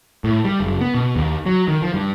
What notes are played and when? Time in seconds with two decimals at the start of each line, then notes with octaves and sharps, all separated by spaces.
0.24 A2
0.45 G3
0.60 F#1
0.81 B3
0.94 B2
1.16 D#2
1.46 F#3
1.68 D#3
1.82 F3
1.94 G2